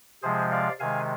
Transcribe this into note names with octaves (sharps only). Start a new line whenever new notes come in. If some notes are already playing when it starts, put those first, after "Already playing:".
C3 F3 G#3 G#4 C5
D5 F5
C3 D#3 G#3 F5 G#5